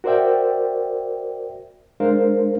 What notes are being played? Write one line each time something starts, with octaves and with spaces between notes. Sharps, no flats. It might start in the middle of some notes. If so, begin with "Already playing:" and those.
F#4 A#4 C5 D5 E5 G5
G#3 D4 A#4 C5 F5